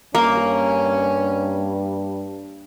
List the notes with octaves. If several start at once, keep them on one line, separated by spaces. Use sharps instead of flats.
G2 A#3 C#4